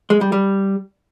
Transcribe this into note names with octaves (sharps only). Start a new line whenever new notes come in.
G#3
G3
G3